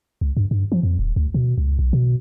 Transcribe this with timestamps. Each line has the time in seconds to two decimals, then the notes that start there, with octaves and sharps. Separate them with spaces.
0.21 C#2
0.37 G2
0.51 G2
0.72 F3
0.83 F2
0.99 D#1
1.16 D2
1.34 B2
1.58 C#2
1.79 B1
1.93 B2